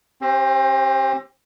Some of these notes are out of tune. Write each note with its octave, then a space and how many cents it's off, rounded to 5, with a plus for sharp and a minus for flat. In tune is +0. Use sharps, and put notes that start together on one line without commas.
C4 +45 G4 -5 C5 +0